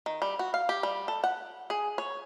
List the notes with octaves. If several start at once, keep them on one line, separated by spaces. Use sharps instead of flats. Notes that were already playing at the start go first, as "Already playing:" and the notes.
D#3
G3
F#4
F5
G4
G3
A4
F#5
G#4
C#5